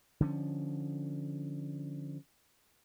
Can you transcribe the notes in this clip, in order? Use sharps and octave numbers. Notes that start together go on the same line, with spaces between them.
D3 F3 C#4